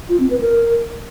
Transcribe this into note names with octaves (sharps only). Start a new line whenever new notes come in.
F4
C4
B4
A#4